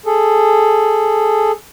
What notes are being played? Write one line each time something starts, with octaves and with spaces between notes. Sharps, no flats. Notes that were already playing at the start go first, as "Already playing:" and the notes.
G#4 A4